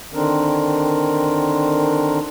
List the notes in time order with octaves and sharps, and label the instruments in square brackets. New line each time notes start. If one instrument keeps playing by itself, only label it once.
[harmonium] D3 D#3 C4 D4 A#4